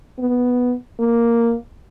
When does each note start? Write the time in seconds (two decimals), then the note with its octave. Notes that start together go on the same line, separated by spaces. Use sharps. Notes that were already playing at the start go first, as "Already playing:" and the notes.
0.19 B3
1.00 A#3